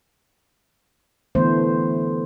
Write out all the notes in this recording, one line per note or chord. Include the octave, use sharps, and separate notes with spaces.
D3 E3 A3 B3 C5